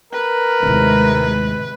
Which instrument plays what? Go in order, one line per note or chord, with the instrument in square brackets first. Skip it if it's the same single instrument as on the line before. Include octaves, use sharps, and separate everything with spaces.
[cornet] A#4 [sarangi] B4
[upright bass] D#2 A2 [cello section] C3 G#3